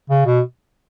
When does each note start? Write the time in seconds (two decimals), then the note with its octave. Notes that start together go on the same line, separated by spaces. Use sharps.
0.10 C#3
0.26 B2